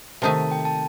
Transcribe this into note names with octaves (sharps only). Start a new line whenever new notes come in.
C3 D#3 A3 D#4 A5
A5
G5
A5